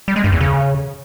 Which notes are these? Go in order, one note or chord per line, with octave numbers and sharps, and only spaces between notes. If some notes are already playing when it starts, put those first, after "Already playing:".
G3
G#3
G2
E2
C#3